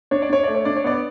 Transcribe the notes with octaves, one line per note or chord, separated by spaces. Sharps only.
D4 C#5
D5
D4 C#5
A3 D5
C#5
D4 D5
C#5
B3 D5